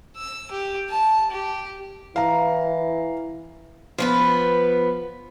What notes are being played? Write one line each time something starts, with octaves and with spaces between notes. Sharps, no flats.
E6
G4
A5
G4
E3 F5 A#5
F3 B3 B4